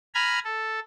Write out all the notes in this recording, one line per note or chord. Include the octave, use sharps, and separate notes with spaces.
G#5 A#5 B5 F6 G#6
A4